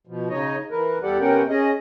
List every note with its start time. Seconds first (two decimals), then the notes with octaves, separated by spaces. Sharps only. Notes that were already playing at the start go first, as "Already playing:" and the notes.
0.07 B2 F3
0.30 C#3 D#4 C#5 D#5
0.71 E3 A#4 B4
1.03 E2 G3 G4 A4 D5 F#5
1.20 C3 B3 C#4 A#4 F#5 G5
1.49 C#4 G#4 D#5